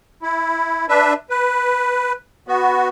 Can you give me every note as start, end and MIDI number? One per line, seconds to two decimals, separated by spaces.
0.22 0.86 64
0.89 1.13 62
0.89 1.13 71
0.89 1.13 76
1.30 2.12 71
2.48 2.89 59
2.48 2.89 66